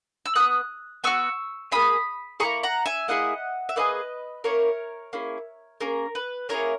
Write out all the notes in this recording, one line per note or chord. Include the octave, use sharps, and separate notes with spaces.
E6
B3 F#4 D#6 F#6
B3 F#4 C#6 E6
A#3 E4 G#4 B5 D#6
A#3 E4 G#4 A#5 C#6
F#5 A#5
E5 G#5
A#3 E4 G#4 D#5 F#5
E5
A#3 E4 G#4 B4 D#5
A#3 C#4 E4 A#4 C#5
A#3 C#4 E4 G#4
A#3 C#4 G#4 A#4
B4
A#3 C#4 E4 G#4 A#4 C#5